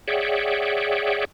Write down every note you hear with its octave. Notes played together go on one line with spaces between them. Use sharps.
G#4 C#5 D5 E5 F#5 G5